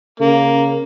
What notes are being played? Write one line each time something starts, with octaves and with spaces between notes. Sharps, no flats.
C#3 A#3